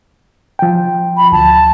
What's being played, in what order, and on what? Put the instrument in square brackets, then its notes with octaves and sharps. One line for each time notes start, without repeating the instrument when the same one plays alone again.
[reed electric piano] F3 G5
[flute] B5
[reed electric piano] D2 F3 [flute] A5